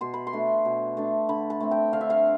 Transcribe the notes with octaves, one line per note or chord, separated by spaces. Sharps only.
B2 C6
B5
C6
A3 D4
B2
A3 D4
D3 B5
A5
A3 C4
G5
D3 F5
E5
F5